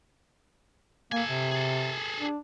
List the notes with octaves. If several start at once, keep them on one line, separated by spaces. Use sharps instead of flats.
A#3 A4 G#5
C3
G#4 A4
D4